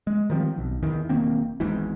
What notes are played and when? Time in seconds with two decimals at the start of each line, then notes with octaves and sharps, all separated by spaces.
0.07 G#3
0.30 D#3 F3 G3 C4
0.58 B1
0.82 E2 D#3 E3
1.09 E1 D#3 A#3 C4
1.60 G#1 E2 G#2 E3